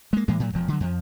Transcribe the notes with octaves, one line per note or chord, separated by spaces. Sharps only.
G#3 A#3
A2 E3 G#3 A#3
A2 F#3
E1 F3
D3 F#3
F2 F3